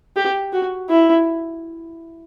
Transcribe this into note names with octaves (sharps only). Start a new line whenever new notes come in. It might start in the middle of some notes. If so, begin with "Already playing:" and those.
G4
F#4
E4